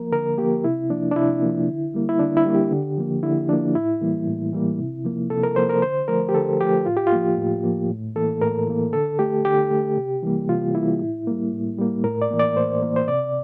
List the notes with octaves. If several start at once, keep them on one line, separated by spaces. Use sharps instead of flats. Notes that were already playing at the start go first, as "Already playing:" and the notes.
Already playing: F3 A#3 A#4
D3 A#4
F3 A#3 G4
C3 E4
F3 A#3 D4
D4
C3 E4
F3 A#3
D3
G3 A#3
E4
D3 D4
E4
G3 A#3
G4
D3
F3 A#3
D3 E4
F3 A#3 D4
A2 E4
E3 G3 A#3
A2
E3 G3 A#3
C3
F3 A#3
C3 A4
A#4
F3 A#3 C5
A#4
D3 C5
F3 A3 A#4
G4
D3 A4
F3 A3 G4
A2 F4
G4
F4
F3 A#3
A2
F3 A#3
A2
E3 A#3 A4
A2 A#4
E3 A#3
D3 A4
A3 G4
D3 G4
A3
C3
E3 G3 A#3
C3 F4
E3 G3 A#3 E4
A2
G3 A#3
A2
G3 A#3
A2 A#4
D5
E3 A#3
D5
A2 C5
E3 A#3
C5
C3 D5